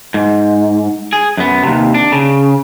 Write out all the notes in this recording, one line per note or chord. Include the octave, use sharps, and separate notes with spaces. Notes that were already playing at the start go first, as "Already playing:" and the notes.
G#2
G#4
F#2 B3
D#2 C3
D4
C#3